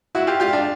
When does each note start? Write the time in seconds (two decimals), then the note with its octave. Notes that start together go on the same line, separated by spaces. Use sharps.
0.15 E4 F#4
0.27 F4 G4
0.40 F4 G4
0.53 D4